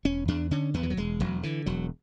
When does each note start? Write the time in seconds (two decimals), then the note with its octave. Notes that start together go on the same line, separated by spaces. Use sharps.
0.05 E1 C#4
0.28 E2 D4
0.51 D3 C#4
0.74 E2 B3
0.83 E3
0.90 F#3
0.97 E1 G#3
1.20 E1 F#3
1.43 D3 E3
1.66 E1 F#3